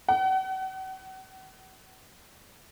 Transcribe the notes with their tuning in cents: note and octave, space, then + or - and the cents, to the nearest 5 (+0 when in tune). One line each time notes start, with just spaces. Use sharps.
F#5 +45